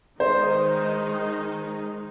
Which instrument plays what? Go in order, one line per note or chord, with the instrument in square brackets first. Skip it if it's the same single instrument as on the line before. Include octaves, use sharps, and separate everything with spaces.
[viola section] D#3 G#3 D#4 [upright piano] C5